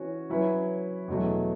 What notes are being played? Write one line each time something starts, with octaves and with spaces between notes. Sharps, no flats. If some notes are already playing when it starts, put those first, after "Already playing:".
Already playing: E3 C#4 F#4
F#3 C#4 E4 B4
E2 B2 F#3 A3 F#4